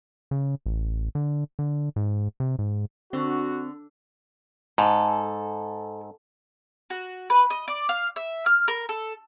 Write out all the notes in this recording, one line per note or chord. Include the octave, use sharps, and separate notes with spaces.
C#3
A1
D3
D3
G#2
C3
G#2
D3 C4 F#4
G#2 A4
F#4
B4
D#5
D5
F5
E5
F6
A#4
A4